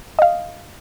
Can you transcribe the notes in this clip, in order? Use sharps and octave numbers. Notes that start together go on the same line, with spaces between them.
D#5 F5